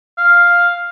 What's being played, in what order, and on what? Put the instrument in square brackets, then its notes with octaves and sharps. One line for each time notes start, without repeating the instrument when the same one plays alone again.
[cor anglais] F5